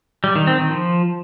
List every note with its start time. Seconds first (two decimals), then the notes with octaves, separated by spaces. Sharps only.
0.24 G3
0.36 D#3
0.47 C4
0.59 D#3
0.71 F3